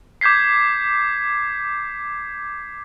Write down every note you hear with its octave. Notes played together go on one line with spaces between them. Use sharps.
D6 G6 G#6 B6 C7